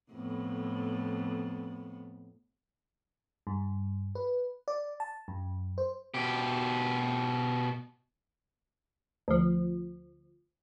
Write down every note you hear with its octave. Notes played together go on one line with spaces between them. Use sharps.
F2 A2 B3
G2
B4
D5
A5
F#2
C5
B2 G4
D2 F3